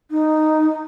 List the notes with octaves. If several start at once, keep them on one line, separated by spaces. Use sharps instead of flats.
D#4